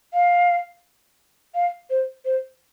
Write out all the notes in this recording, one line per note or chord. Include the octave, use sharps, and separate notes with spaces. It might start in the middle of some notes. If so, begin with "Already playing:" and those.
F5
F5
C5
C5